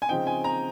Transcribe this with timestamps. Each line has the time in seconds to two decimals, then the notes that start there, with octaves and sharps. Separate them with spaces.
0.02 G#5
0.09 C#3 F3 C4 D#4 G5
0.27 G#5
0.44 A#5